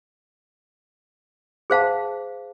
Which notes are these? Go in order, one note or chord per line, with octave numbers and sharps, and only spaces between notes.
G#4 C5 F5 A5